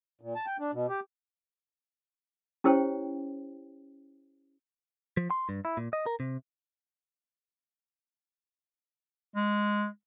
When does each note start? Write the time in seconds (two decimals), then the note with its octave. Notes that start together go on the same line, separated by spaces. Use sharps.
0.21 A#2
0.35 A5
0.46 G5
0.59 D4
0.73 B2
0.89 G4
2.64 C#4 E4 G4 C5 C#5 G5
5.17 F3
5.31 C6
5.49 G2
5.65 E4
5.77 A#2
5.93 D#5
6.06 A#4
6.20 C3
9.36 G#3